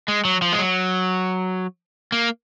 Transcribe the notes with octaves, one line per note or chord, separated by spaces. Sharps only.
G#3
F#3
F3
G#3
F#3
A#3